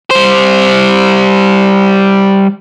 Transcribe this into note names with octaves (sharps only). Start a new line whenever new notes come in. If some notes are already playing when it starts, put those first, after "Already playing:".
G3 C5